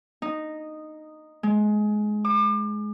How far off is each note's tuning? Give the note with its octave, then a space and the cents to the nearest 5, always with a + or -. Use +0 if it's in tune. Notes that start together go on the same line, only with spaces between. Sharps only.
D#4 -10
G#3 +20
D6 +35